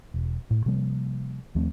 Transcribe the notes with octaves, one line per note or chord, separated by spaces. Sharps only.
E1
A2
C3 F3 G3 A#3
D#2 F3 A3 C4